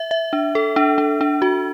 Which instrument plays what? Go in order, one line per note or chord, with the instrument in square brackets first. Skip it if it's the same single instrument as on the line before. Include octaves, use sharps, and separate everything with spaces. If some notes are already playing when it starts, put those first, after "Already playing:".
Already playing: [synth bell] E5
E5
D4
A4
D4
D4
D4
F#4